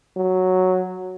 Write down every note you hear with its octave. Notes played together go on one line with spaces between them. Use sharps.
F#3